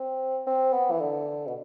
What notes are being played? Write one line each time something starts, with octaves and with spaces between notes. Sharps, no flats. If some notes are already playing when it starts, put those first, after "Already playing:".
Already playing: C4
C4
B3
E3
D3
B2